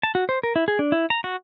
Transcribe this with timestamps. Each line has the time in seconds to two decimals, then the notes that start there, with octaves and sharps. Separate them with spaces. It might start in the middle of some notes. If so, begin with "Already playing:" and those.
0.03 A5
0.15 F#4
0.29 C5
0.43 A#4
0.56 E4
0.68 G#4
0.79 D4
0.92 E4
1.10 A#5
1.24 F#4